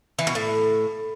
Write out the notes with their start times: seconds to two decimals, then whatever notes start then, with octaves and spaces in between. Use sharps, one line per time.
0.19 E3
0.27 B2
0.35 A2